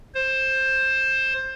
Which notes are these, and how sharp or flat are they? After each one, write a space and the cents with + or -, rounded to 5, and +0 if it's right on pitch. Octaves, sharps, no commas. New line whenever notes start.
C5 +15